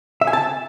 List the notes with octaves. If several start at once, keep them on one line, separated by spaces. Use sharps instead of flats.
E5
G#5
A5